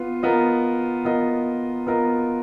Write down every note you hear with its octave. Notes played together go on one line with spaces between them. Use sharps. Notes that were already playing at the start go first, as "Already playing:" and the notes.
Already playing: B3 F4
B3 F4 A#4 D#5
B3 F4 A#4 D#5
B3 F4 A#4 D#5